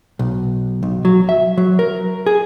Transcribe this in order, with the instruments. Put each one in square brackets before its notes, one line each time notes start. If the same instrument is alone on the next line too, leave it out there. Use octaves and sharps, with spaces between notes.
[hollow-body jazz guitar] B1
B1
F#3
E5
F#3
A#4
G#4